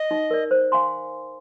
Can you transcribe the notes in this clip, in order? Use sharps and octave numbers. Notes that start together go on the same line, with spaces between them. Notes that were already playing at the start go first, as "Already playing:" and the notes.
Already playing: D#5
D#4
A#4 D5
C5
F5 G#5 C6